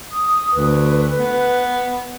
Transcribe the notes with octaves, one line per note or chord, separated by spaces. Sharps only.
D#6
D2 B4
B3